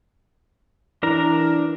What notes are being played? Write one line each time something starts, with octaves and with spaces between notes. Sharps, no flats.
E3 D4 A#4 A#5